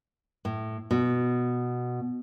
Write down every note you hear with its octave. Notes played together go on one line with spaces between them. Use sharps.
A2
B2